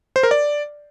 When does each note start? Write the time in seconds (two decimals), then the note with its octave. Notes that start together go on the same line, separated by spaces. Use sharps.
0.16 C5
0.23 A#4
0.31 D5